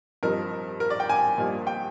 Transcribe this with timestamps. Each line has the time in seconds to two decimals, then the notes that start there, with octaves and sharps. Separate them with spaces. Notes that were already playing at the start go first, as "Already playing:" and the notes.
0.23 G2 F3 C4 D#4 A#4
0.80 A#4
0.90 D5
1.00 G5
1.09 G#5
1.38 G2 F3 A#3 D#4
1.67 G5